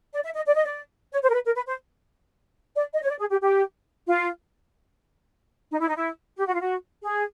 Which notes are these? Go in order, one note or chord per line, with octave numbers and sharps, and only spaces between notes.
D5
E5
D#5
D5
D#5
D5
C#5
C5
A#4
B4
A#4
B4
C5
D5
D#5
C#5
D5
G#4
G4
G4
F4
D#4
E4
D#4
E4
G4
F#4
F4
F#4
G#4